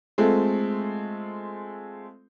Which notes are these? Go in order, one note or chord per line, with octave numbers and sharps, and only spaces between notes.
G#3 A3 C4 F4 A4